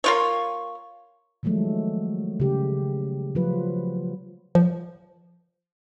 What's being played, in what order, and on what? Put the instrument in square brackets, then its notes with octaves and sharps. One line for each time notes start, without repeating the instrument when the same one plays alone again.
[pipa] A#3 F4 C#5
[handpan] D#3 F3 F#3 G#3 A3
C#3 G4
F3 F#3 F4 B4
[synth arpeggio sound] F3